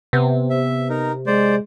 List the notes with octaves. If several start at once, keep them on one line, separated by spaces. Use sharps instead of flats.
C3 B3
E5
D#4 A#4
G#3 C5 D5